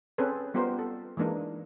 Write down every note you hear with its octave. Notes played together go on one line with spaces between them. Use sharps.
C4 C#4 G#4 A4 B4
G3 B3 F4 G4 A#4 C5
A4
E3 G#3 A#3 D4 D#4